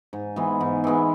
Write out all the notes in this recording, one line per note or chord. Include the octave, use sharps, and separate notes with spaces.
G#2
E3 G#3 B3
G#2
E3 G#3 B3